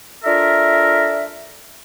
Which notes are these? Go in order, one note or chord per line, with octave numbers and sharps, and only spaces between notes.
D4 F4 A4 A#4 E5